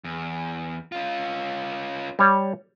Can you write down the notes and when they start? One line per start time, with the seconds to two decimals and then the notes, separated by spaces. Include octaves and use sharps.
0.04 E2
0.92 C#4 F4
2.19 G3 C#5